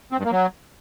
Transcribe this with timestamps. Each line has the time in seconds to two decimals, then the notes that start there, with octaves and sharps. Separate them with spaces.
0.12 C4
0.19 G2
0.25 A#3
0.32 F#3